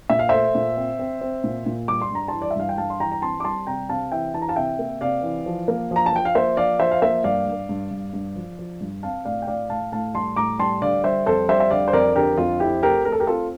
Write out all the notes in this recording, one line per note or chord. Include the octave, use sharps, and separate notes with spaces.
A#2 E5
F5
A3 C5 E5
A#2
C4
C4
C4
A#2
A#2
G3 D6
C6
G2 A#5
E3 A5 C6
D5
E5
G2 F5
G5
G2 F5 A5
C6
E3 G5 A#5
A#5
C4 A5 C6
D6
G3 A5 C6
C3 G5 A#5
C3 F5 A5
E3 E5 G5
E3 A5
A#5
F5 A5
C3 E5 G5
A#3
C3 D5 F5
E3
F3
A#3
F3
A#5
A5
F3 G5
F5
A#3 C5 E5
F3 D5 F5
F3 C5 E5
F5
A#3 C5 E5
G2 D5 F5
G2
G2
G2
G2
F3
F3
G2
C4 F5 A5
A2 D5 F5
G5
A2 D5 F5
A2 F5 A5
A2 F5 A5
G3 A5 C6
A2 A#5 D6
G3 A5 C6
D3 D5 F5
G3 C5 E5
F2 A4 C5
G3 C5 E5
E5
D3 D5 F5
C5
F2 A#4 D5
D3 G4 A#4
F2 F4
C4 E4 G4
A3 G4 A#4
A3 A#4
A4
G4 A#4
C4 F4 A4